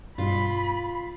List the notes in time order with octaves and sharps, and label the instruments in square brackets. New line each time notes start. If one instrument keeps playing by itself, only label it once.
[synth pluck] G2 B2 G3 [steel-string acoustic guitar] F4 [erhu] B5